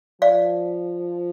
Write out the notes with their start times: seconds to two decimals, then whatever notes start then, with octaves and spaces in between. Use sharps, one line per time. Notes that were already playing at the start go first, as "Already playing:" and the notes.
0.21 F3 D5 F5